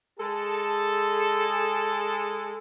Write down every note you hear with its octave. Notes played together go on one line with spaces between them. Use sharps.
G#3 G#4 A4